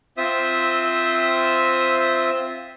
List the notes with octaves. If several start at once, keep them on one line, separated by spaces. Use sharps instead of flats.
C4 F4 C5 E5 D#6